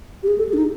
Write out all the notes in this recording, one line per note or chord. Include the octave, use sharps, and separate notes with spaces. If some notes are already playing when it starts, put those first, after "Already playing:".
G4
G#4
A4
G#4
D4
D#4